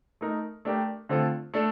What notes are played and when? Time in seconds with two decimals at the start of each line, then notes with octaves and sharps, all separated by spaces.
0.21 A3 D#4 A#4
0.65 A3 D4 G4 A#4
1.09 D3 A3 C4 F4 A4
1.54 A3 D4 A4